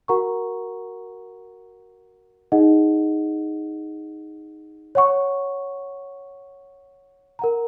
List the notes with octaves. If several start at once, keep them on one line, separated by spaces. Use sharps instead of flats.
F#4 A#4 F#5 A#5 C#6
D#4 G#4 D#5 F#5
C#5 F#5 C#6
A#4 F#5 A#5